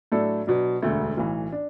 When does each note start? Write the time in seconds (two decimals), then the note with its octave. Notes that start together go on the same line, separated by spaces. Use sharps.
0.12 A2 F#3 A3 D4 A4
0.47 B2 F#3 D4
0.82 E1 D2 D3 A3
1.17 B1 A2 E3
1.52 D4